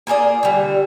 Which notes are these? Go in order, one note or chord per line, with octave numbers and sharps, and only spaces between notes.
A#3 F4 G#4 D5
D3 G3